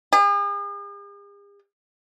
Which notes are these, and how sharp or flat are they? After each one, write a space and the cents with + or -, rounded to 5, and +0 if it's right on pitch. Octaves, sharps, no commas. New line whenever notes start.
G#4 -45